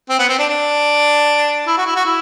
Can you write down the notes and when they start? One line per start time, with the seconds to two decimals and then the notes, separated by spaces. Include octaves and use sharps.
0.09 C4
0.19 B3
0.29 C4
0.38 D4
0.49 D4
1.67 E4
1.77 F#4
1.86 E4
1.96 F#4
2.05 E4